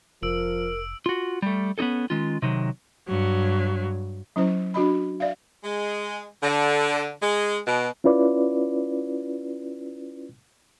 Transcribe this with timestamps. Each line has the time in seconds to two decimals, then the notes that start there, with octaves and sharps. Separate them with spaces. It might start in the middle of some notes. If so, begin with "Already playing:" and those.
0.23 F1 F3 A#4 E6 D7 F#7
1.06 F4 F#4
1.42 G3 A3
1.78 B3 C#4 D#4 G#4 A4
2.10 D#3 G#3 C#4 F4
2.42 C3 D#3 F#3
3.06 G2 F#3
4.36 F#3 C#4 E4 C5
4.74 D4 F#4 D#5 B5
5.20 D5 E5 F5
5.64 G#3
6.42 D3
7.21 G#3
7.65 B2
8.04 C#4 E4 F4 B4 D5